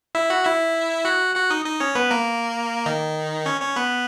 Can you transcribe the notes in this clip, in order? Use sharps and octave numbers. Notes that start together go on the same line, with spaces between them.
E4 E5
F#4 F#5
E4 E5
F#4 F#5
F#4 F#5
D#4 D#5
D#4 D#5
C#4 C#5
B3 B4
A#3 A#4
D#3 D#4
C#4 C#5
C#4 C#5
B3 B4